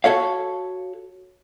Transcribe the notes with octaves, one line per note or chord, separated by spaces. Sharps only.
F#4 A4 C#5 F5